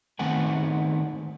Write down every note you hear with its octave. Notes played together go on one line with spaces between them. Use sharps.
D#3 A3 B3 C4 F#5 G#5